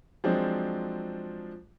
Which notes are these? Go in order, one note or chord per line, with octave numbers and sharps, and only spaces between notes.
F3 F#3 G#3 C4 D4